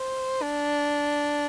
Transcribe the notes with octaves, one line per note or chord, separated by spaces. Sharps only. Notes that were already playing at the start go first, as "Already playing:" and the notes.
Already playing: C5
D4